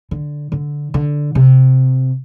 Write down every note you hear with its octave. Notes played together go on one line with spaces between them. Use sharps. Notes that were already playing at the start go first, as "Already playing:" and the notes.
D3
D3
D3
C3